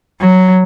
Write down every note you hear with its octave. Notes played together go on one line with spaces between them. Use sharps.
F#3